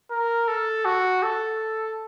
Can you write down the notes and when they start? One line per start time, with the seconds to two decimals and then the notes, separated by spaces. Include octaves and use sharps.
0.11 A#4
0.48 A4
0.85 F#4
1.23 A4